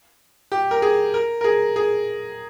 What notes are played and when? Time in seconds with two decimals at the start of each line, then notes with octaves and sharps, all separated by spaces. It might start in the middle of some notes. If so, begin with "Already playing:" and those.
0.52 G4
0.71 A#4
0.82 G#4
1.14 A#4
1.41 A#4
1.44 G#4
1.76 G#4